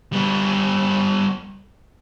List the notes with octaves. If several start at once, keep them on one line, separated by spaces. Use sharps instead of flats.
G3 B3